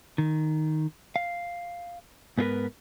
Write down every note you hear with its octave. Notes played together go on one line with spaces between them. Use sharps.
D#3
F5
G#2 B3 D#4 F4 A#4 B4